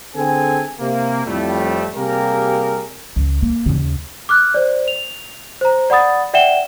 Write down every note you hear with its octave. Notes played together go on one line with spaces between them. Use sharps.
D3 C4 G#4 A4 G#5
C3 A#3
F2 A2 G3 A3
C3 G3 A#3 G4 G#4 A#4
C#2
A#3
D#2 C#3
D6 F6 F#6
C5 D5
F7
C5 A#5
D5 F#5 B5 D#6 A6
D5 E5 F#5 G5 E7 G7